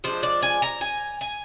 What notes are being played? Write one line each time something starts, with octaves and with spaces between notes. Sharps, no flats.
F3 G#3 D4 C5
D5
G#5
A#5
G#5
G#5